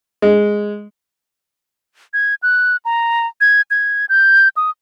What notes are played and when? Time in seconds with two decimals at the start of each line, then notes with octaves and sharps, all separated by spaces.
0.22 G#3
2.14 G#6
2.43 F#6
2.85 A#5
3.41 G#6
3.71 G#6
4.09 G6
4.57 D#6